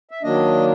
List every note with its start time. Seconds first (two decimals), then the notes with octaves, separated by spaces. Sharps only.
0.11 E5
0.23 D#3 F#3 A#3 D4 D#5